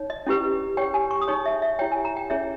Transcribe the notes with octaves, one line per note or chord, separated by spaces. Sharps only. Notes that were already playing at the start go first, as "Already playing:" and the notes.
Already playing: D#4 C#5
D#5
C#4 E4 G4 B4
G4 C#5 G5
G#5
C#6
D#6
D#4 G#4 C#5 C#6
E5
E5
E4 G4 C#5 G5
G#5
A#5
G5
C#4 E4 G#4 C#5 E5